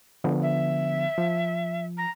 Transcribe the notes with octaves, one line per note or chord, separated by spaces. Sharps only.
D3 F3 B3
E5
F3
A#5